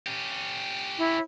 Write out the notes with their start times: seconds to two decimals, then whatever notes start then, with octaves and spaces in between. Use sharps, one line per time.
0.07 C#4 G4
0.98 E4